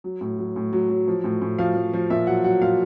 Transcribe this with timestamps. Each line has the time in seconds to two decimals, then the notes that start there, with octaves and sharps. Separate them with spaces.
0.04 F#3
0.21 A2
0.38 F#3
0.56 A2
0.73 F#3
0.89 F#3
1.08 F3
1.24 A2
1.41 A2
1.58 F3 F5
1.76 F3
1.93 F3
2.10 A#2 E5
2.27 F#3 F#5
2.44 F#3 F#5
2.61 A#2 F5